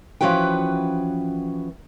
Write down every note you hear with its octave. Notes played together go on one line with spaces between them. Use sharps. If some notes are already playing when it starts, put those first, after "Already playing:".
E3 F3 C#4 F#4 B4 G5